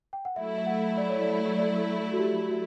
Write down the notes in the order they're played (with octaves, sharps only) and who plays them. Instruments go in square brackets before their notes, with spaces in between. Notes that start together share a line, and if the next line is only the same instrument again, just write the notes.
[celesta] G5
F#5
[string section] F#3 A3 E4 [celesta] E5
[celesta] E5
F#5
D5
C#5
D5
D5
F#4
G4
F#4